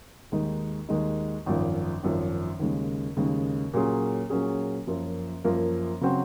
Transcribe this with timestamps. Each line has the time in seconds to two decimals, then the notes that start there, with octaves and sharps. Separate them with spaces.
0.32 D#2 D#3 G#3 D#4
0.89 D#2 D#3 G#3 D#4
1.46 G#1 F#2 F3
2.03 G#1 F#2 F3
2.60 D#2 C#3 G#3
3.17 D#2 C#3 G#3
3.74 A#2 F#3 C#4 G#4
4.30 A#2 F#3 C#4 G#4
4.87 F#2 F3 A#3 F4
5.44 F#2 F3 A#3 F4
6.01 C#3 F#3 C4 F#4